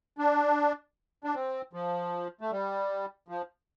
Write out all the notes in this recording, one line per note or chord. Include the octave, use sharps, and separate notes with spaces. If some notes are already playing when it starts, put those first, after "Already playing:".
D4
D4
C4
F3
A3
G3
F3